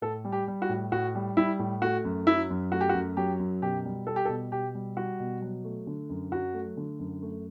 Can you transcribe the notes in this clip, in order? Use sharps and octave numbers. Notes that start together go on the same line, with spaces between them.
A2 A4
G3
G4
G3
F#4
A2
A2 F#4
G3
G3 E4
A2
A3 F#4
F#2
F#3 E4
F#2
A3 F#4
G4
F#4
F#2
F#3 G4
F#2
B2 G4
G3
G3 A4
G4
A4
B2
B2 G4
G3
G3 F#4
B2
F#3
A3
D3
F#2
F#3 F#4
A3
D3
F#2
A3